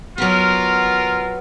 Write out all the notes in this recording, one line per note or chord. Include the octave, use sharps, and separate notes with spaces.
F#3 B3 F4 A#4